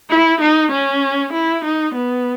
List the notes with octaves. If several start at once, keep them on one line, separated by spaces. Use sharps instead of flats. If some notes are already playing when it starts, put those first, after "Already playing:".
E4
D#4
C#4
E4
D#4
B3